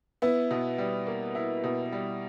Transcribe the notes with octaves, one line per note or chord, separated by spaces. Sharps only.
B3 E4
B2
G3
A#3
E4
B2
G3